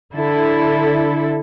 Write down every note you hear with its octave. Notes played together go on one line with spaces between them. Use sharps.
D3 E4 A4